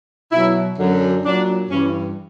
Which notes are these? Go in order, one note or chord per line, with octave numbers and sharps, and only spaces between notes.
B2 F#3 E4
F#2 D3 F#3
A#2 F#3 D4
G2 E3 C#4